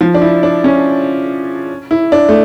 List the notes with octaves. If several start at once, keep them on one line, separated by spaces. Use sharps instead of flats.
F3
D4
E4
D4
C#4
E4
D4
A3